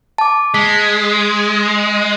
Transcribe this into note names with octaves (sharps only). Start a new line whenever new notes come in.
A5 D6
G#3 B6